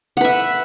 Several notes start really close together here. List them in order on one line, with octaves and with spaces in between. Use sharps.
F#5 B4 E5